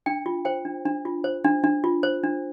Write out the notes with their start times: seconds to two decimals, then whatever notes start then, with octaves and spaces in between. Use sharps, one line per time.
0.06 D4 G5
0.26 F4
0.45 C5 G5
0.65 D4
0.85 D4
1.05 F4
1.24 C5
1.44 D4
1.64 D4
1.84 F4
2.03 C5
2.24 D4